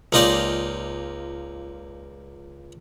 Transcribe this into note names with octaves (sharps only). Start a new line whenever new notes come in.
C#2 A#3 D#4 F4 D5 G5